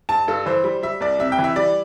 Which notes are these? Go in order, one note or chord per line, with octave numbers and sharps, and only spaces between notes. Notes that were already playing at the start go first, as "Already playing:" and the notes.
G2 A5
G2 A4
E3 C5
G3
G3 E5
C2 D5
C3 E5
G5
E3
E5
G3 D5